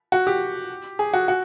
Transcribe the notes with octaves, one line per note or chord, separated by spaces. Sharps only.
F#4
G4
G#4
F#4
F#4